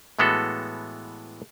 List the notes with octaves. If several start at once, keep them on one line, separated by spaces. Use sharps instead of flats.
A2 E3 G#3 B3 F#4 A4